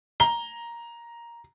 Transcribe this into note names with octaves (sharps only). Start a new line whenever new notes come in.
A#5 G7